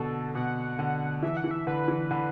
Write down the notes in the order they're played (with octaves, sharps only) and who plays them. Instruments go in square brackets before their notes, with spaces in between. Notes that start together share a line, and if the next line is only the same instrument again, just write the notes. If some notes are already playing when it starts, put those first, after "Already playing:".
Already playing: [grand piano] B2 D3 [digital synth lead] A4
[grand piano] B2 [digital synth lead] F#5
[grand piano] D3
[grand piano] E3 [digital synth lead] E5
[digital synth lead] F#5
[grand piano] E3
[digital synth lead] E5
[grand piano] D3 [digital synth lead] B4
[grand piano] E3
D3